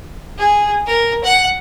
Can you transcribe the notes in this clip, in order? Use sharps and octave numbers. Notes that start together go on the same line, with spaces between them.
G#4
A#4
F#5